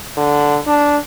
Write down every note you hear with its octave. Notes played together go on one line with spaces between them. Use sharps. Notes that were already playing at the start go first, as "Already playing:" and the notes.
D3
D4